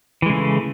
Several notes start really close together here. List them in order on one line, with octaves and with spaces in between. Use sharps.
E3 G#3 C#3 A3